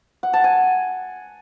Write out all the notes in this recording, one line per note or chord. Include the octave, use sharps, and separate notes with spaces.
F#5
A5
G#5